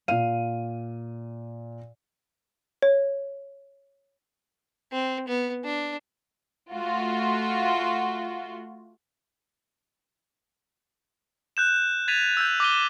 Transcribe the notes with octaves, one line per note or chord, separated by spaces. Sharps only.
A#2 F5 D#7
C#5
C4
B3
D4
A3 F4 F#4
F#6 G6 E7
G#6 A6 B6 D#7 F7
E6 G6
D6 A#6 D#7 G7